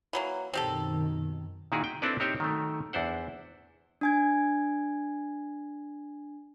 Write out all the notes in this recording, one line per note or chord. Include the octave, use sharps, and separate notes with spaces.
E3 F#3 A#3
F#2 B2 D#3 C4 G4 A4
A#2 D#3 D#4 E4 F#4 G#4
G5
C4 D4 E4 A4 B4 D5
C4 D#4 G4 A#4 C5 C#5
D#3 F#3 A3
E2 D4 E4 C5 F#5
D4 G#5 G#6